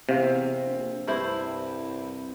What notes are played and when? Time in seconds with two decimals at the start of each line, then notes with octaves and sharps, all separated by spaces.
0.09 E2 C3 C4 F5
0.66 A#1
1.07 C2 G2 E4 C5